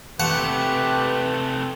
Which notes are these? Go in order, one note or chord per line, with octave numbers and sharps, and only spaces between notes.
C3 A3 G4 B4 F#5